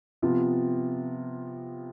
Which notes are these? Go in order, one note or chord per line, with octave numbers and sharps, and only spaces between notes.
C3 F3 B3 F4